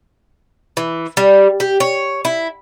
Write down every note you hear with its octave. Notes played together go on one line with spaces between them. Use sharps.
E3
G3
G4
C#5
E4